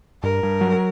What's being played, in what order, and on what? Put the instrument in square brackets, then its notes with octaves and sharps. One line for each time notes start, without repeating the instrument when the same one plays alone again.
[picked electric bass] G2 [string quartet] A#4
[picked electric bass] G2
F#3